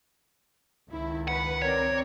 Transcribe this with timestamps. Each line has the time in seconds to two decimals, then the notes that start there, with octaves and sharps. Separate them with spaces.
0.91 C#2 D#3 E4
1.28 B4 F#5
1.62 C4 A#4 C#5 D5